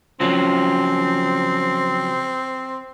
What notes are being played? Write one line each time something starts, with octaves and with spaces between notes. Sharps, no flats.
C#3 F3 F#3 C4